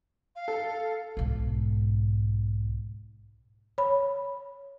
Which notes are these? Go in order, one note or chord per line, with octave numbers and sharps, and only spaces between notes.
F5
A4
B1 G#2
C#5 B5